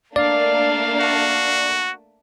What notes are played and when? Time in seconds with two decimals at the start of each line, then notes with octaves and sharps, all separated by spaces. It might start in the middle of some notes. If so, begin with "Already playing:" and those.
0.16 A3 A#3 D4 D5 F5
1.00 F#4